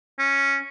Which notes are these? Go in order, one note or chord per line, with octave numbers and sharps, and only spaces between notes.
C#4